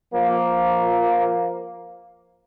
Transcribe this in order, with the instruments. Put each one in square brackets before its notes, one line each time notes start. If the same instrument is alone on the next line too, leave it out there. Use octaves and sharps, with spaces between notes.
[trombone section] F3 A#3